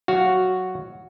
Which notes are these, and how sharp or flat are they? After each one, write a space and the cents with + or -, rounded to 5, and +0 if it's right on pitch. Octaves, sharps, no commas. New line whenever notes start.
F#3 +0 F#4 +0 F5 +0